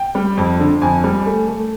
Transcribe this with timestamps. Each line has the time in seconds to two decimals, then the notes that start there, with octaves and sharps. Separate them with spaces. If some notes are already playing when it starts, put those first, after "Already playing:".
Already playing: G5
0.15 G3
0.37 F2
0.60 D3
0.82 F2 G#5
1.04 G3
1.26 A3
1.48 A3